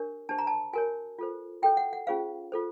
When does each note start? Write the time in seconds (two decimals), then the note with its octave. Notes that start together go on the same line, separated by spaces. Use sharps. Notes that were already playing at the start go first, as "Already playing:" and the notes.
Already playing: D4 G4 A#4 C#5
0.29 D4 G4 C5 A5
0.38 A#5
0.47 A5
0.73 F#4 A#4 C#5 G#5
1.19 F4 A4 C5
1.62 F#4 A4 C#5 G5
1.77 F#5
1.93 F#5
2.07 C#4 F4 G#4 C5 F5
2.52 F4 A4 C5